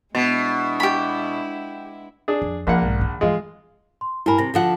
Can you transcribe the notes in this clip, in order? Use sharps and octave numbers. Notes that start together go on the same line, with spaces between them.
B2 G#3 B3 D4 E4
G4 B5
D4 G#4
F2
A#1 F3 A#3 F#5
B1 G#2
D3
G2 E3 G#3 F4
C6
G2 E4 A#4 G#5 B5
C3 A#6
D3 F3 F#5